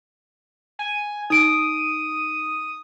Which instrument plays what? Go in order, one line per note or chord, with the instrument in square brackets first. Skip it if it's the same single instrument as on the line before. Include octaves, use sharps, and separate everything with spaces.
[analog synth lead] G#5
[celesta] D#4 D7 [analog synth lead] D#6